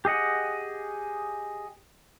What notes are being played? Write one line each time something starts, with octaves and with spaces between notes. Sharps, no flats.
G4 G#4 D#5 F#5